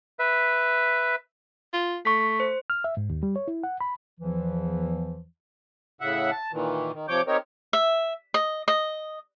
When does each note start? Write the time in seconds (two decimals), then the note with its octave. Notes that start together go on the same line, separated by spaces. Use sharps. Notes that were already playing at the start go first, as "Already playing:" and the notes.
0.19 B4 E5
1.73 F4
2.05 A3 C#6 B6
2.40 C5
2.70 F6
2.84 E5
2.97 G#2
3.10 D#2
3.23 G3
3.36 C#5
3.48 E4
3.63 F#5
3.81 B5
4.20 E2 E3 F3
6.01 A2 C#3 E5 F#5
6.31 A5
6.53 A#2 D#3 E3
6.93 D#3
7.08 C3 F3 C#5 D6 G6
7.27 C4 D#4 G4 A#4 C#5
7.73 E5
8.34 D#5
8.68 D#5